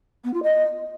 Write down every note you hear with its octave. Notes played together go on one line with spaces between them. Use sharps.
B3
F4
D#5